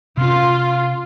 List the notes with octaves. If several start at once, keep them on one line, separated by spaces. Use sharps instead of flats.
C3 C#4 F4